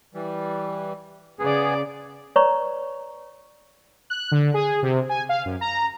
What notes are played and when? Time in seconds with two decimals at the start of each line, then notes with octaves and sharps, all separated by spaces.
0.14 E3 G3
1.39 C#3 B3 G#4 D5
2.36 B4 C#5 D5 A#5 B5 C#6
4.10 F#6
4.32 D3
4.54 G#4
4.83 C3
5.09 G#5
5.29 F5
5.45 F#2
5.61 A#5